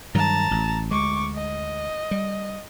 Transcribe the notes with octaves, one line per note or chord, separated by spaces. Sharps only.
G2 D#3 F#3 A5 A#5
A1
D2 G#3 C#6 D6
D#5
G3